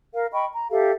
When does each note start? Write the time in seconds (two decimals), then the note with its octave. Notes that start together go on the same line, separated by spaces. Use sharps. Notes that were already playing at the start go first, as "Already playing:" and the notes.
0.15 A#4 F5
0.33 D#5 G5 B5 C#6
0.53 A#5
0.70 G4 A4 E5 F5